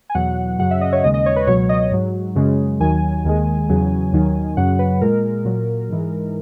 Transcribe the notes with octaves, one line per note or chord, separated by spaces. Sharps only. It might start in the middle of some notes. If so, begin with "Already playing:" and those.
G#5
E2 B2 F#3 F#5
F#2 C#3 F#3 F#5
E5
D#5
C#5
D#2 C#3 G#3 D#5
D#5
C#5
B4
C#2 B2 F#3 C#5
D#5
G#2 F#3
F#2 C#3 G#3
D#2 D#3 F#3 G#5
D#2 D#3 G#3
E2 C#3 F#3
D#2 D#3 F#3
F#2 C#3 F#3 F#5
B4
A#2 G#3 A#4
A#2 F#3
G#2 E3 G#3